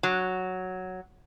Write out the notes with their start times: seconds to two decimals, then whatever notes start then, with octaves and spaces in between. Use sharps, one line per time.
0.03 F#3